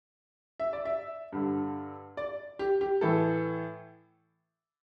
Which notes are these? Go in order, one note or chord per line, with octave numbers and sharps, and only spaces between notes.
E5
D5
E5
G2 D3
D5
G4
G4
A2 E3 A4